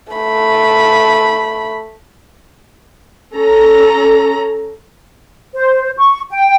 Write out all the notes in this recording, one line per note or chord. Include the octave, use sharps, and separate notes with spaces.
A3 B5
C#4 A4 A#5
C5
C#6
G5